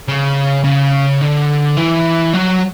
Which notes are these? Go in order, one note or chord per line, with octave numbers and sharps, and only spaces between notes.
C#3
C#3
D3
E3
F#3